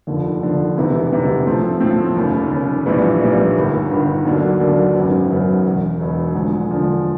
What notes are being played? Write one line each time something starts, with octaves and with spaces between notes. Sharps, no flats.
F1 D#2 D3 F3
F1 D#2 D3 F3
E1 D2 C3 E3
E1 D2 C3 E3
A2 F3 A3 C4
A2 F3 A3 C4
F1 D#2 C#3
F1 D#2 C#3
A#1 A2 E3 G3
A#1 A2 E3 G3
G1 G2 D#3
G1 G2 D#3
D#2 D3 F#3 A#3 D4
D#2 D3 F#3 A#3 D4
G#1 F#2 C#3 F#3 B3
G#1 F#2 C#3 F#3 B3
E1 E2 B2
E1 E2 B2
E1 D2 D3 F3 G#3
E1 D2 D3 F3 G#3